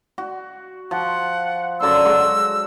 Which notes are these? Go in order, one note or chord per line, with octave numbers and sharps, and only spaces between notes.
F#4
F3 F#5
F#2 D3 C6 E6
G#3 F#4